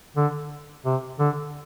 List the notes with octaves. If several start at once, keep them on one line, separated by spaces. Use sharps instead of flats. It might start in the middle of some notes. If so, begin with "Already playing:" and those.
D3
C3
D3